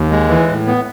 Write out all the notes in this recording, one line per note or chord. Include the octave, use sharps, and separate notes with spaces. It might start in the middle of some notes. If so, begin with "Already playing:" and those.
Already playing: D#2
G#3
E3
A2
B3